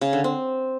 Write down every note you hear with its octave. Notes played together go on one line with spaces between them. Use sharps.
C#3
D3
C4